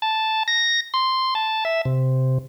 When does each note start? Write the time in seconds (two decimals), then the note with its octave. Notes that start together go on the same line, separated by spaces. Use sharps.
0.02 A5
0.48 A#6
0.94 C6
1.35 A5
1.65 E5
1.85 C3